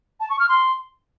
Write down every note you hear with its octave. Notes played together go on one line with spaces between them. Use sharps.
A5
C#6
F6
C6